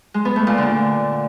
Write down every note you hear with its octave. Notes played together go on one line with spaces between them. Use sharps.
G#3
B3
A3
A#2
D3